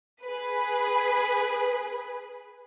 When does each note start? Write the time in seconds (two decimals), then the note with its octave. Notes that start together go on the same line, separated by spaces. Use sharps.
0.24 G#4 B4